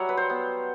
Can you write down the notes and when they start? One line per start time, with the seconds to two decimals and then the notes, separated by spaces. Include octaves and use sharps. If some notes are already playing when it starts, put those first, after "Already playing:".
Already playing: F#3 G3 E5 F#5
0.09 B4
0.17 C5
0.30 B3